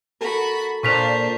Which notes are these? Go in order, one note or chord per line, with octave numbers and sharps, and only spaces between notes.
F#4 A4 A#4 B5
A#2 D4 F4 C5 C#6 B6 F7